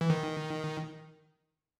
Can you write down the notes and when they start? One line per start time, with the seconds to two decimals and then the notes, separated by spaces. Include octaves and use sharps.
0.01 E3
0.10 D#3